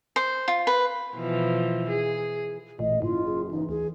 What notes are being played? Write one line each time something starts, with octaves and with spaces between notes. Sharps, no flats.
C5
F4
B4
B2 E3 F3
G#4
A1 A#2 A3 D#5
F#1 G#2 E4 F4
G#4
E3 D#4
D2 G#4